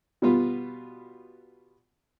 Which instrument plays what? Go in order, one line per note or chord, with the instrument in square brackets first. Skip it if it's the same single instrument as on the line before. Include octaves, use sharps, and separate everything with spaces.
[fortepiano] B2 G3 B3 F4